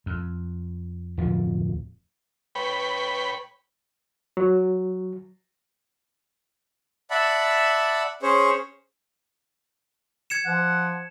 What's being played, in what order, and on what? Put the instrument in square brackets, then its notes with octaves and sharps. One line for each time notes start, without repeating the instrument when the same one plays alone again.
[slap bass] F2
D1 F2 F3
[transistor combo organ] B4 C#5 G5 B5
[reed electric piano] F#3
[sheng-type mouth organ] D5 E5 F#5 A5 B5
C#4 G#4 C5 C#5
[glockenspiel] G#6 C#7 E7
[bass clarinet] F3 [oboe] F#5